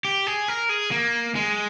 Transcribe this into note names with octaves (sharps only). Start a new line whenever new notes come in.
G4
G#4
A#4
G#4
A#3
G#3